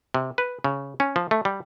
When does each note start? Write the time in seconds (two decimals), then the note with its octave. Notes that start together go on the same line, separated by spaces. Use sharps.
0.14 C3
0.38 B4
0.64 C#3
1.00 C#4
1.16 F3
1.31 A3
1.45 G3